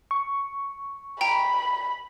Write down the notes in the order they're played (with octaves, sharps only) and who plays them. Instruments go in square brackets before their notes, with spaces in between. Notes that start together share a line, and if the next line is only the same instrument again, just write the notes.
[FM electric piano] C#6
[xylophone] G5 A#5 [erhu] B5